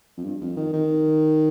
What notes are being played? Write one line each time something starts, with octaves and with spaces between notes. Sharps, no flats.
F2
G2
F2
D#3
D#3